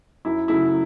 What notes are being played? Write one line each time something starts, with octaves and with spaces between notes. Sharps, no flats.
F#2 E4
C#3 F#3 A3 E4